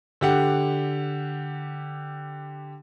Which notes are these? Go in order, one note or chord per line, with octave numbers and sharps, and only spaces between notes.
D3 G4 F#5